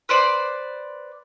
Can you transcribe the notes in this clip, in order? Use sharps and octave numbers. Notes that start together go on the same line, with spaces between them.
B4 C5 D5